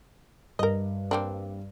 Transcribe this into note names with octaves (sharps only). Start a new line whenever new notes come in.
G2 A#4 D#5
A#3 C4 D4